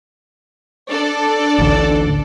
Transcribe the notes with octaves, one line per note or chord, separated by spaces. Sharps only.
D4 A4 D5
A1 D2